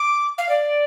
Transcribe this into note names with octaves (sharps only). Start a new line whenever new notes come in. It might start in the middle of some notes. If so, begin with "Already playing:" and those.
Already playing: D6
F5
D5